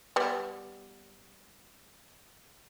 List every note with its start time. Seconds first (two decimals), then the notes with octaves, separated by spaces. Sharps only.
0.16 G3 B3